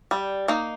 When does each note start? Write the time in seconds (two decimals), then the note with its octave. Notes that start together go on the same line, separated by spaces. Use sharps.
0.11 G3
0.48 A#3 D#4